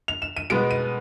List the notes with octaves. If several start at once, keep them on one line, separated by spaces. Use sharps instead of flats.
F7
E7
D#7
B2 G#3 B3 D7
D#7